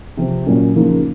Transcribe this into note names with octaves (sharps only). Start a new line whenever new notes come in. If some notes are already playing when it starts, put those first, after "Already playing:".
C3 F3 C4
A#2 F#3 A#3 C#4
C#3 F3 A#3 D#4